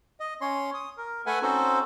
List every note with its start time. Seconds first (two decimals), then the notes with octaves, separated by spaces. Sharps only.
0.20 D#5
0.41 C#4 C#5 C6
0.74 D#6
0.97 A#4
1.26 A3 A4 B4 E5 F#5 G#5
1.42 C4 C#4 D#4 F#4 A4 C5